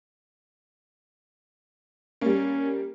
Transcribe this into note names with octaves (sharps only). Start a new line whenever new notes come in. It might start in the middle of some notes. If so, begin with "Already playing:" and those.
G3 A#3 C#4